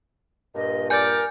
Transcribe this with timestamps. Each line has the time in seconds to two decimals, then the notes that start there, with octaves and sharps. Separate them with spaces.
0.55 G2 A#2 D#5
0.90 A#4 D5 G#5 G6